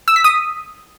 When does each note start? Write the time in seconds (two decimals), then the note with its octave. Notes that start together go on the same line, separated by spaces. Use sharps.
0.08 E6
0.16 B6
0.24 D#6